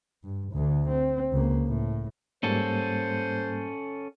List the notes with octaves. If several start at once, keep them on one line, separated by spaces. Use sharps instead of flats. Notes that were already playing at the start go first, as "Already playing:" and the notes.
G2
D2 D3
C4
C#2 A#3
A2
G#2 G3 A#3 C#4 A4 C5